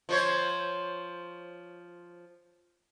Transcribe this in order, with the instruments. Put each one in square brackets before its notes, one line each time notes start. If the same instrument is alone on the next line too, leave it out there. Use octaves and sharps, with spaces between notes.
[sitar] F3 C5 C#5